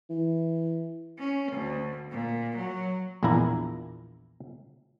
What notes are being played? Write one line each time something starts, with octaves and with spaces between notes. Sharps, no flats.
E3
C#4
D2
A#2
F#3
A#1 E2 A#2 D4 E4 A#5